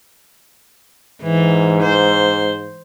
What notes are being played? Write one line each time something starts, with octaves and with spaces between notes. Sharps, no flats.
G#2 E3
C5